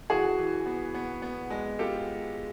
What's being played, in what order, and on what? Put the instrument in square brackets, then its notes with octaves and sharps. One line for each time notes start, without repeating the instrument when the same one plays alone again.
[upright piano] E3 [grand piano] F#4 G#4
[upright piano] E3
B3
B3
B3
G#3
[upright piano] F4 [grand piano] G4 A4